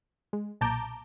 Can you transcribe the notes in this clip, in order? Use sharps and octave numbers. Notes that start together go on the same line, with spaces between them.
G#3
B1 A#2 A5 A#5 D6 G6